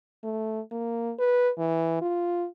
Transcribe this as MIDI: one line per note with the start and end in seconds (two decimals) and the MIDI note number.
0.23 0.60 57
0.71 1.13 58
1.19 1.50 71
1.58 1.97 52
2.01 2.46 65